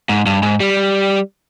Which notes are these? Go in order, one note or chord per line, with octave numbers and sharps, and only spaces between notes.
G#2
G2
G#2
G3